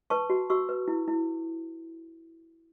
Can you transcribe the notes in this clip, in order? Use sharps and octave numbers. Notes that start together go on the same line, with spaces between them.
B4 A5 C#6
F#4
F#4 C#6 E6
B4
E4
E4